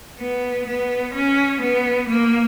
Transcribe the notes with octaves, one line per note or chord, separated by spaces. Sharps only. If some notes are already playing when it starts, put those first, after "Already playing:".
B3
B3
C#4
B3
A#3